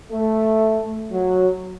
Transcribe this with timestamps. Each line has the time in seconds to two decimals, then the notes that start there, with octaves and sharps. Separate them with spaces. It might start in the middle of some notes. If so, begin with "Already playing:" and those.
0.11 A3
1.12 F#3